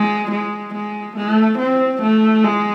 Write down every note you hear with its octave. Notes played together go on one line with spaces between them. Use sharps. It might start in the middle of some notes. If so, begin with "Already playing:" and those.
Already playing: G#3
G#3
G#3
A3
C4
A3
G#3